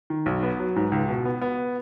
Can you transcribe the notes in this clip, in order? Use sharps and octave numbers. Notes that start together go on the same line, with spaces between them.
D#3
B1
B3
F#3
G#2
C#2
B2
B3
B3